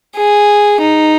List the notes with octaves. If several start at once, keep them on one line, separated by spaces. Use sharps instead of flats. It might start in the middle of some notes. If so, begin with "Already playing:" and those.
G#4
D#4